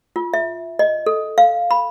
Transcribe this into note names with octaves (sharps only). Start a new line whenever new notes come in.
F4
E5
D#5
A4
F5
B5